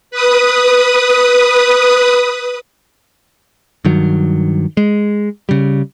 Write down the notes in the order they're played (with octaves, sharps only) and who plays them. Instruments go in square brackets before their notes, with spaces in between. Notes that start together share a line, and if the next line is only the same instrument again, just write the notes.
[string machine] B4 D#6
[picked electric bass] G2 D#3 F#3
G#3
C#3 G3